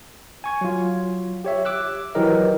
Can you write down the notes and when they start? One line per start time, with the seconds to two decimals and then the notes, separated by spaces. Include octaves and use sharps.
0.44 G#5 C#6 G#6
0.61 F#3 F4
1.44 G4 C#5 E5
1.65 D6 E6 F#6
2.15 E3 F#3 E4 G4 A#4 D#5